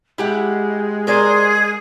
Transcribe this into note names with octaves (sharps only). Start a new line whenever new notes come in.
G#3 E4 G4 F#5
G#4 A#4 C5 D5